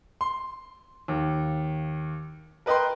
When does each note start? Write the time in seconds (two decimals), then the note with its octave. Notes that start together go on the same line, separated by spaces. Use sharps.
0.21 C6
1.08 D#2
2.66 A#4 B4 D#5 G5 C6